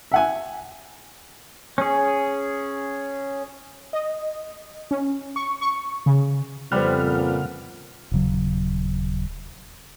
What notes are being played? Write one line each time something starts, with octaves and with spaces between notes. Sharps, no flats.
E5 F#5 G#5
C#4 G#4
D#5
C#4
C#6
C#6
C#3
F2 C#3 G3 B3 C4 F#5 F6
A#2
D#1 C#3 F#3